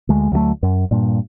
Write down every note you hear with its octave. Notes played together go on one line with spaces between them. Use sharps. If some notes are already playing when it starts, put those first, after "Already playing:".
D2 G#3
D2 F#3 G3 A3
F#2
G2 A#2